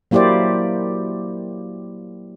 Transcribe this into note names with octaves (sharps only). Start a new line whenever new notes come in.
F#3 A#3 E4 G4 C5 D5